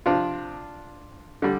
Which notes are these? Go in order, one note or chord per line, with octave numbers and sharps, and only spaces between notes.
C3 F3 C4 D4 F4
D3 G3